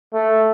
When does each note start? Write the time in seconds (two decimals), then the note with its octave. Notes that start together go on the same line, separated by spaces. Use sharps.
0.14 A3